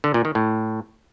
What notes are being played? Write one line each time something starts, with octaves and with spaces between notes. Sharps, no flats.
D3
A#2
D#3
A2